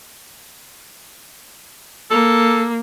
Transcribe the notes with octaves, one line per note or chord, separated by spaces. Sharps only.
A#3 A4